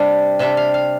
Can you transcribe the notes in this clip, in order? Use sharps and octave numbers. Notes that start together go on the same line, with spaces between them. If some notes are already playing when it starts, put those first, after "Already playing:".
Already playing: C3 G3 D4
C3 G3 D4 E5
F5
F5